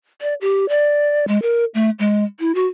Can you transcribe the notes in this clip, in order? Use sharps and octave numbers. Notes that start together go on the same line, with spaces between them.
D5
G4
D5
G#3
A#4
A3
G#3
E4
F#4